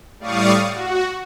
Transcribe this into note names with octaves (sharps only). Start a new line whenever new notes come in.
A2 G3 D5 F5 C#6 D#6
F#4